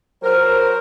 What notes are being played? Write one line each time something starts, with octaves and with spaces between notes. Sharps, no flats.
F#3 A#4 C5